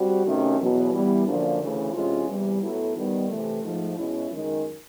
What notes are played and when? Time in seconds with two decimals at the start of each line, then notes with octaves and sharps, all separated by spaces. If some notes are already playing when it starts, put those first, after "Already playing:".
Already playing: G3 C4 F#4
0.25 C3 D#3 F#3 A3 C#4
0.59 E2 B2 F#3
0.93 E3 G3 B3
1.27 F#2 D3 F3 A#3 D4
1.60 D2 C#3 E3 A3
1.94 C3 E3 G#3 C#4 F4
2.28 E2 C3 E3 G3
2.62 A2 F#3 B3 E4 A4
2.96 D#3 G3 B3
3.29 C3 E3 A3
3.63 G#2 F3 A3
3.96 B2 G#3 C#4 E4
4.30 F#2 D#3 G#3